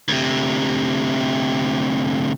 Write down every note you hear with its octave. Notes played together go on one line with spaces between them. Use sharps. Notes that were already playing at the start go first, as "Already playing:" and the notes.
D2 C3